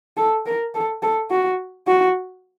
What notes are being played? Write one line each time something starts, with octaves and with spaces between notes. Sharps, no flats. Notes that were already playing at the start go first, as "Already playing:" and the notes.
A4
A#4
A4
A4
F#4
F#4